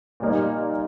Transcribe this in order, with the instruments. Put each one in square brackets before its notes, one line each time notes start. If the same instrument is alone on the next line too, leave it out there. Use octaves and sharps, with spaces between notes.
[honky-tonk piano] A#2 G3 A#3 D#4